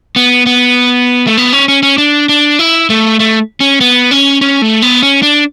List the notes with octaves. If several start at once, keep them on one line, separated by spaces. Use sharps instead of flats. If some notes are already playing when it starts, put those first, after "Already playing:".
B3
B3
A3
B3
C#4
C#4
C#4
D4
D4
E4
A3
A3
C#4
B3
C#4
C#4
A3
B3
C#4
D4